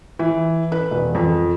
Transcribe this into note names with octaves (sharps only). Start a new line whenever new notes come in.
E3
B4
E1
F2